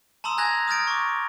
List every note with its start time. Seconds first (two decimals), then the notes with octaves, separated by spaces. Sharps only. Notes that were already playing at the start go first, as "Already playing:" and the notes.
0.24 A5 A#5 C6 D#6 E6
0.38 G#5 A#5 F#6 G#6 A#6 F7
0.68 D#6 F6 G6 A6 D7
0.87 C#6 D6